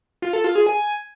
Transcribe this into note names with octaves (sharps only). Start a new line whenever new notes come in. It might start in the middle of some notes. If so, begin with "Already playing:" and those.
F4
A4
F4
G#4
G#5